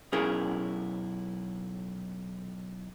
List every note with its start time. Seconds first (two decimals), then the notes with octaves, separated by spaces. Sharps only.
0.12 B1 C#4 E4 G#4 A#4